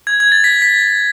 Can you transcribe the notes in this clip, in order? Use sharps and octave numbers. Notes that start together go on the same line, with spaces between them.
G#6
G#6
A6
B6
B6